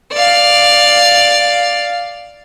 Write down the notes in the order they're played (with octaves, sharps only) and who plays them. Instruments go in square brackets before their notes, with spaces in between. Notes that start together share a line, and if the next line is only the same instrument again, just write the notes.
[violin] D5 F5